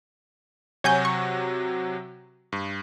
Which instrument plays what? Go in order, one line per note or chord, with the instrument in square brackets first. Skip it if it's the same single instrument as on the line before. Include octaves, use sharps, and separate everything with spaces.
[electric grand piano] C3 F#3 F#4 [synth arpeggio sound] C#5 G#5 G6
[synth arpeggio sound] C#6
[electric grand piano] G2